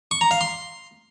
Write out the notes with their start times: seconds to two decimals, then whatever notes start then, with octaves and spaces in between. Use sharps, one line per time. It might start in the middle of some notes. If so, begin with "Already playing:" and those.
0.11 C#6
0.21 A#5
0.31 F5
0.41 C6